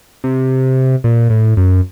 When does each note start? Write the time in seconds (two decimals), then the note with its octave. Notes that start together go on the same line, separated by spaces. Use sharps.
0.24 C3
1.04 A#2
1.30 A2
1.57 F#2